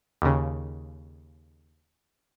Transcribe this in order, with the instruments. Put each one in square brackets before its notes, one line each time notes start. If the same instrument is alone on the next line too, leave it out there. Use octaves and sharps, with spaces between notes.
[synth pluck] D#2 C#3